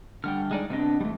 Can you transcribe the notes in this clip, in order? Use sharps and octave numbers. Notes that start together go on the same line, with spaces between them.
D3 G3 F#5 G5 F6
G#3 D#4 D5
C3 B3 C4 D4 D#5
G#2 E3 G3 A3